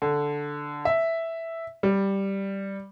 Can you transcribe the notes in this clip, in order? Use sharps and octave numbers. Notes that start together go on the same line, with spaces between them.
D3
E5
G3